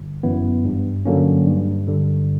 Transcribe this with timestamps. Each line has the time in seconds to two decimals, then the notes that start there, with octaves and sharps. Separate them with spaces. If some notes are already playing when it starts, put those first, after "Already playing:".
Already playing: G1
0.23 F#2 E3 B3
0.65 G2
1.05 D3 F#3 A#3 C#4
1.47 G2
1.87 D3 G3